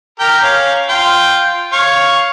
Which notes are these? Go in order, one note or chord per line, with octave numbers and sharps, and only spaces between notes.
G4 A#4 G5
C#4 F5
F4 G5
C#5 F5